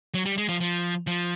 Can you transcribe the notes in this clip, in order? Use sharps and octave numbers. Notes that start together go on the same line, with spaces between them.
F#3
G3
G#3
F3
F3
F3